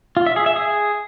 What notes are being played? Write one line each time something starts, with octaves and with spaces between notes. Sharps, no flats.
F4
E5
G#4
E5
G#4